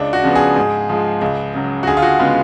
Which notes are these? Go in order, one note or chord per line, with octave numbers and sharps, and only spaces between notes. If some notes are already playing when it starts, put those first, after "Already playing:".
Already playing: C#2 D4
F#4
C#3 F3 B3
G#4
G#2
F3 G#3
C#2
C#3 F#3
F#4
D2 G#4
F4
F#4
C#3 G#3 B3 F4